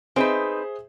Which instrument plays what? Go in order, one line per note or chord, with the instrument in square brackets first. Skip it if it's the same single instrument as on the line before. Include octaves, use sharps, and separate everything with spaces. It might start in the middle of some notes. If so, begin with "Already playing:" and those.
[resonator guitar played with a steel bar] C4 D#4 B4 [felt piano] G#4 C5 E5